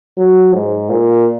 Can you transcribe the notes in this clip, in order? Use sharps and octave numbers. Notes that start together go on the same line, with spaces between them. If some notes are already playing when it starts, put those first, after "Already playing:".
F#3
G#2
A#2